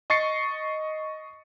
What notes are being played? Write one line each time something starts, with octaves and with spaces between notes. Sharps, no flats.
D#5 C#6 A6 C7 C#7